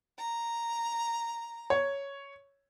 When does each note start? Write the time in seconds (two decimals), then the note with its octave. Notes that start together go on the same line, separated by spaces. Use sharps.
0.20 A#5
1.70 C#5